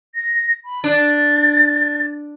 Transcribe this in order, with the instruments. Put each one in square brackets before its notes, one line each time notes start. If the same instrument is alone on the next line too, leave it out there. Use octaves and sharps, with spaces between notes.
[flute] A#6
B5
[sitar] D4 [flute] A6